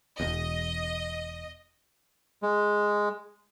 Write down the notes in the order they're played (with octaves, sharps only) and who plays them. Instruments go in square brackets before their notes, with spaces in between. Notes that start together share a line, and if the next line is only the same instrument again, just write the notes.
[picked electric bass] E1 E2 [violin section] D#5
[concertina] G#3